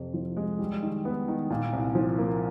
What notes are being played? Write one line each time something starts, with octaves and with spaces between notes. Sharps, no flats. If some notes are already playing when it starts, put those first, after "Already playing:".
Already playing: F2 C3
F3
G#3
G3
D#3
B3
D#3
A#2
C2
F3
A#3